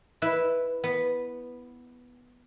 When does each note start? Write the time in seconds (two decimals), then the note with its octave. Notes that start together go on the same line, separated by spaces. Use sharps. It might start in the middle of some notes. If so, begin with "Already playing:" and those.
0.22 E4 B4
0.84 B3